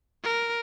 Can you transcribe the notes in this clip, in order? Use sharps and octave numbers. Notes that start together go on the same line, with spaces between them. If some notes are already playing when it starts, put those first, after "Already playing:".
A#4